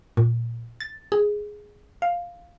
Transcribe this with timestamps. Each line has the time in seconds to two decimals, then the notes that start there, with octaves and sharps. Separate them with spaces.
0.17 A#2
0.80 A6
1.12 G#4
2.02 F5